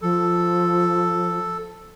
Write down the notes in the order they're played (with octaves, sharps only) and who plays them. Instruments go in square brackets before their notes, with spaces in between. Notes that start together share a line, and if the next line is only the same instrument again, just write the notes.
[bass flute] F3 [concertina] A4